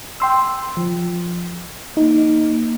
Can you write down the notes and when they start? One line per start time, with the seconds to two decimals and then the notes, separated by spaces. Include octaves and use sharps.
0.20 G5 C6 E6
0.77 F3
1.97 A#3 D#4